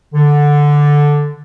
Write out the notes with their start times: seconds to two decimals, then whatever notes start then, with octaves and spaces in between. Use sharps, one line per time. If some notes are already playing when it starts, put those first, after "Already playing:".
0.13 D3